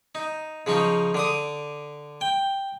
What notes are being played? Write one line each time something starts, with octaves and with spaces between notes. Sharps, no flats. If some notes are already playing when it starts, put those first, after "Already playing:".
D#4
C#3 F3 D#4 C#6
D3 D6 D#6
G5